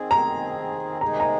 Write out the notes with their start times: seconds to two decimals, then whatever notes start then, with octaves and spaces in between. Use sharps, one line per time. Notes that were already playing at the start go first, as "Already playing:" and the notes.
Already playing: D#3 C4 G#4
0.11 A#5
1.01 C3 D#3 G#3 D#4 G#4 A#5
1.20 A#5